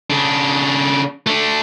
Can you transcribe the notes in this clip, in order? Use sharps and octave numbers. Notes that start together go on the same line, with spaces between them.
C#3 D4
A3 D4